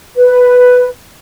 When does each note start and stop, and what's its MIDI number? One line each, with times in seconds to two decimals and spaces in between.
0.17 0.87 71